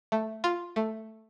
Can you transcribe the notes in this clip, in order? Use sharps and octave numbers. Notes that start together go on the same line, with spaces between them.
A3
F4
A3